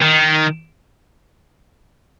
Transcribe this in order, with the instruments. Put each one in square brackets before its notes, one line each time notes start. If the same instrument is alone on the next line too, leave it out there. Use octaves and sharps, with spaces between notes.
[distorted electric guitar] D#3